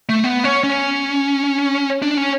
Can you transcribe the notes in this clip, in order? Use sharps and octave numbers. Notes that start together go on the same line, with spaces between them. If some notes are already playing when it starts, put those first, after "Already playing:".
A3
B3
C#4
C#4
D4
C#4